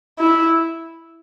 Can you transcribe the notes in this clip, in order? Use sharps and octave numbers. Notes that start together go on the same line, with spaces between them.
E4